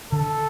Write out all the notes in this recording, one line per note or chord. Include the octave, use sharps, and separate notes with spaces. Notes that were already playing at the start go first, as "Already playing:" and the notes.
D3 A4